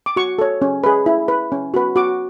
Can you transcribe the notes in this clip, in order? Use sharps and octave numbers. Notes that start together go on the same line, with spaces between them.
D6
F#4 C#6
A4 C#5
C#4
G#4 B4
E4
B4
C#4
F#4 B4
F#4 D6